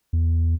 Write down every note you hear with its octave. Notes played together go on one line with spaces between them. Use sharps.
E2